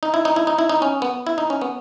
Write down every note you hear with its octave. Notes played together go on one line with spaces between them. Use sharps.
D#4
E4
D#4
E4
D#4
E4
D#4
C#4
B3
E4
D#4
C#4
B3